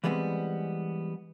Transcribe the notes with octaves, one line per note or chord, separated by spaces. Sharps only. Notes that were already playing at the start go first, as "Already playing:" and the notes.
E3 G3 G#3 B3 C4